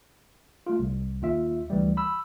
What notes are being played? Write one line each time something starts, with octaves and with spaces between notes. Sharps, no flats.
A3 F4
C2
D#2 F4 E5
D2 E3 G3
B5 E6